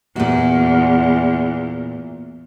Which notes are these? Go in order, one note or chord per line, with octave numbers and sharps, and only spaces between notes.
E2 A#2 F#4